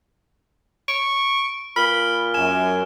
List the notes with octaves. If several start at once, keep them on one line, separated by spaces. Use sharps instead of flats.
C#6 D7
A#2 B5 F6 G7
F#2 G#5 E7